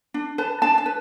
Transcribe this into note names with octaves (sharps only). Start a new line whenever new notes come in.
D4
B4 A5
D4 A5
A5
B4